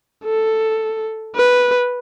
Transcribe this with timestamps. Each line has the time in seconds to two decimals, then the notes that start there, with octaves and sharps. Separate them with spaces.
0.24 A4
1.36 B4